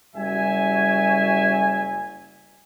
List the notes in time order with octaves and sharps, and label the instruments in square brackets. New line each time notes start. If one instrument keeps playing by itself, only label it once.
[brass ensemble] F#1 G3 F#4 E5 G#5